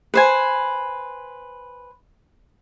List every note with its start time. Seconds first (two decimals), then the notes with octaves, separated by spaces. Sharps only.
0.14 B4 C5 G#5